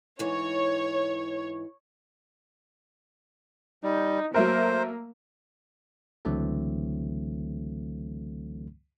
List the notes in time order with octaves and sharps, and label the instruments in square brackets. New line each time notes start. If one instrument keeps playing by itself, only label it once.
[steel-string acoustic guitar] G#2 E3 [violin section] C#5
[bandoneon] G3 [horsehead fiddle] D#4
[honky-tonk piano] F#3 A3 A#4 [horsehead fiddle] A#3 [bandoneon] C5
[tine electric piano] C#2 D3 E3 F#3 A3 C4